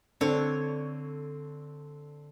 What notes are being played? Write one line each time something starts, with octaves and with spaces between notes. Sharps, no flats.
D3 C4 D4 A4 C#5